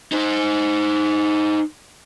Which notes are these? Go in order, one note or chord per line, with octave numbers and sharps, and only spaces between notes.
D#4 C5